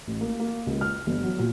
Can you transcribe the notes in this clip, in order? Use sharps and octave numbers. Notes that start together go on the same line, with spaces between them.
A1
A#3
A#3
C#2
F6
G1
F#3
A#2